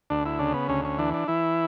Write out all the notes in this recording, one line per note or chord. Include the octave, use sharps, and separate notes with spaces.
D2 D4
E4
C#3 D4
B3
D2 C#4
C#4
E3 D4
D4
E3 E4